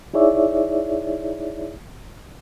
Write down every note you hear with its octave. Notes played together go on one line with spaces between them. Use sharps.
D#4 E4 G#4 C#5 D5 E5